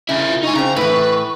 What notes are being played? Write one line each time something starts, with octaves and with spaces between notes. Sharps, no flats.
C#3 E4 A#4
F4
D#4 G#5 C#6
C#3 C4 A#5
A2 E3 B4